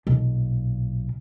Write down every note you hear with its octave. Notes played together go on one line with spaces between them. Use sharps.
B1 A#2